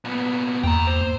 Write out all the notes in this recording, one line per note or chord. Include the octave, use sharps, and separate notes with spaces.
A#2 B3
E2 G2 A#3 G5 A#5
C5